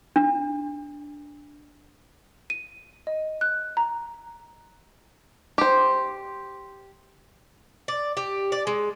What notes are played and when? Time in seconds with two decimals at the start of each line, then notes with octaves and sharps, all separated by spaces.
0.16 D4
2.50 D#7
3.07 D#5
3.41 F#6
3.77 A#5
5.58 G4 C5
7.88 D5
8.17 G4
8.52 D5
8.67 G#3